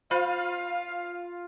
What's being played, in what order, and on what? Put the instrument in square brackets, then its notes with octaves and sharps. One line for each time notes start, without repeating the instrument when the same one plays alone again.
[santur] F4 [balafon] C5 B5 [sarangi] F5